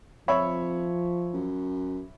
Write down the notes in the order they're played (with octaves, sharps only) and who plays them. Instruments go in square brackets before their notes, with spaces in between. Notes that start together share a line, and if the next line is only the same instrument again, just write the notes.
[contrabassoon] F2 [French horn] F3 [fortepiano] C#5 E5 B5
[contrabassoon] F#2